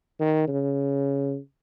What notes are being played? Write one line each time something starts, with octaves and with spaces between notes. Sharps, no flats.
D#3
C#3